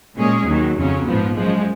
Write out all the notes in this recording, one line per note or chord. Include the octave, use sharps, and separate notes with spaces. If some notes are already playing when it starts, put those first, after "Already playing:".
A#2 G#3 C#4 G#4
D#2 D#3 F#3
F2 C#3 F#3 C#4
A#1 G#2 F3 B3
F#2 F3 G#3